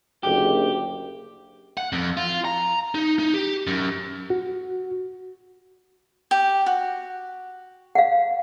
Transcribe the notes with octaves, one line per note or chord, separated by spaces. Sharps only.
F#1 D2 G4
F#5
F2
F4
A#5
D#4
D#4
G4
F#2
F#4
G4
F#4
F5 F#5